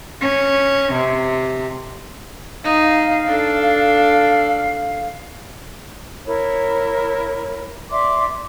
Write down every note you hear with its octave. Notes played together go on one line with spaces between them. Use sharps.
C#4
C3
D#4 F5
D4 A4
E4 A#4 C#5
D5 E5 C6 D6